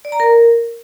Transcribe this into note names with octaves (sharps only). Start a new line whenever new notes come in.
D5
A#5
A#4